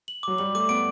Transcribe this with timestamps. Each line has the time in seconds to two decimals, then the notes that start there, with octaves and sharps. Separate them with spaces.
0.08 F#7
0.23 F#3 D6
0.38 G3 F#7
0.55 A3 D6
0.69 B3 D7